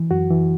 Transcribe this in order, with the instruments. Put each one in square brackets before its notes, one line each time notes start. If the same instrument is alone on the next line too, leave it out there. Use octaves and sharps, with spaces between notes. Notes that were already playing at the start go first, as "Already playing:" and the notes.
Already playing: [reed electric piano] E3
F#2 F#4
E3